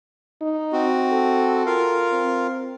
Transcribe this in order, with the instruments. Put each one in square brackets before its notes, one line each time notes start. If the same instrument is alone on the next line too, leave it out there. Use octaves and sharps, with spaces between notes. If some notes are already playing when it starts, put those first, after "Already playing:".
[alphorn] D#4
[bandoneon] C4 F#4
[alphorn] A4
[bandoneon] F4 A#4 F5
[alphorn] C4